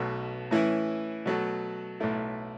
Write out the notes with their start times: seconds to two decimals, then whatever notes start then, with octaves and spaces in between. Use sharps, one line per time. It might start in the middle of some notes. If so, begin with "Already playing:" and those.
Already playing: B1 B2 F#3 A3
0.51 A2 E3 C#4 E4
1.26 B2 F#3 A3
2.00 B1 A2 A3 E4